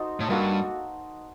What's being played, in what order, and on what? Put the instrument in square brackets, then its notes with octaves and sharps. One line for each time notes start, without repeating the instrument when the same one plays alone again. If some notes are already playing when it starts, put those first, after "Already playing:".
Already playing: [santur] D#4 F#4 A4 C5
[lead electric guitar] A2
[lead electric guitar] G2 [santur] A#3 F#4 A4